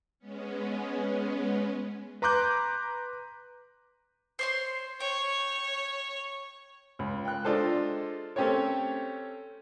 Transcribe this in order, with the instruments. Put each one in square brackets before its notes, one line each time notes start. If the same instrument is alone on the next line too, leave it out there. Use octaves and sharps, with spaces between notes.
[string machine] G#3 B3 C#4
[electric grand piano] B4 A#5 C6 D6 F#6 G6
[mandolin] C5 C#5 C6
[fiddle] C#5 [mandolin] G5
[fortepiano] C#2
G5 F#6
G#3 D4 F4 A4 C5
A3 C4 C#4 G4 C5 C#5